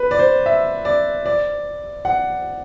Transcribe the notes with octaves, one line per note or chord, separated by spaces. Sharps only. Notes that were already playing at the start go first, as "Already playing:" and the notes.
Already playing: B4
D5
C5
E5
D5
D5
F#5